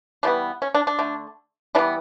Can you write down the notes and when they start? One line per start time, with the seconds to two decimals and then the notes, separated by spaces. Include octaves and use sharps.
0.23 E3 G3 B3 D4
0.62 C#4
0.74 D4
0.87 D4
0.99 D3 A3
1.75 E3 G3 B3 D4